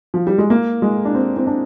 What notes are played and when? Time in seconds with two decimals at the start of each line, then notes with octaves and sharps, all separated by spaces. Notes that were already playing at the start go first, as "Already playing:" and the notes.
0.14 F3
0.27 G3
0.38 G#3
0.50 A#3
0.82 G#3
1.05 D4
1.15 C4
1.36 C4
1.47 D4